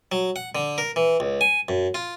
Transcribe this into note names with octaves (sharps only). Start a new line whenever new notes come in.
F#3
F#5
D3
A#4
E3
C#2
G#5
F#2
F4